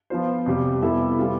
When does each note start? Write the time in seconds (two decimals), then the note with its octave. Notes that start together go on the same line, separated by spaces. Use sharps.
0.10 F3 B3 F4 C5
0.46 F2 C3 G3
0.82 G3 B3 E4 A4 E5
1.18 G3 B3 F4